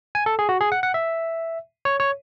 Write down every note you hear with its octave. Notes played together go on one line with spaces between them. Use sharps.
G#5
A4
G#4
F#4
G#4
F#5
F#5
E5
C#5
C#5